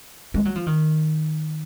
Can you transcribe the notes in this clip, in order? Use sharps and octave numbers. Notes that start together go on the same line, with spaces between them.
G#3
F#3
F3
D#3